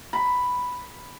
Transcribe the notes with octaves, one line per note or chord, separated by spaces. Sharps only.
B5